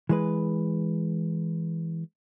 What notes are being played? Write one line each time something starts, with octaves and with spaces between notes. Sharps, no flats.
E3 G#3 B4